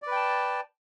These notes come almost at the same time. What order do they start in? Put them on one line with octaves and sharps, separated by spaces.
D5 B4 G5 A5